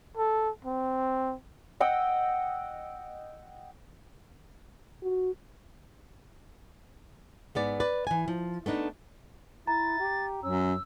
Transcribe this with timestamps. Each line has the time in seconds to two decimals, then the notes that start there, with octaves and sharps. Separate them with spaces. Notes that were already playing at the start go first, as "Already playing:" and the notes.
0.17 A4
0.65 C4
1.80 D#5 F#5 G5 E6
5.03 F#4
7.55 G#2 B3 D5
7.80 B4 D5
8.07 E3 G#5
8.28 F3
8.66 A3 B3 D4 D#4
9.67 E4 A#5 A6
10.00 G4
10.43 F#2 C#4 E6